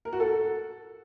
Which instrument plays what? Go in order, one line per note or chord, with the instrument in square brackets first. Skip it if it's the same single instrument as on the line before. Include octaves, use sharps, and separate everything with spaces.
[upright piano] A#4
F#4
A4